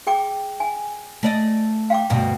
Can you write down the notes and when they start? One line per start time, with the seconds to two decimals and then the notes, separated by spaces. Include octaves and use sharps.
0.07 G#4 G5 D6
0.60 G#5
1.23 A3 D5 D#5
1.90 F5 G5 D6
2.10 D2 G2 B2